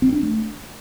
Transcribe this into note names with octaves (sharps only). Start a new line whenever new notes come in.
C4
D4
A3